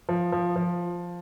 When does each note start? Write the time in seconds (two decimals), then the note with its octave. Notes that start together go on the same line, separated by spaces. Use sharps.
0.09 F3
0.32 F3
0.56 F3